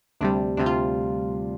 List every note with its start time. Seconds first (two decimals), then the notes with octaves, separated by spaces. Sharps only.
0.21 D2 C3 G3 D4
0.57 D2 C3 G3 D4
0.66 F4